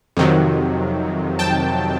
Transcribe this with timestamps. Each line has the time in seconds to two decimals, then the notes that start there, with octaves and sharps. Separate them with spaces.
0.17 F2 C3 D#3 F#3
1.39 G5 A5